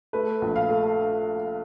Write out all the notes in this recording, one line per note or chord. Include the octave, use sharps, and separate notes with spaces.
A3 B4
A#1
F5
A3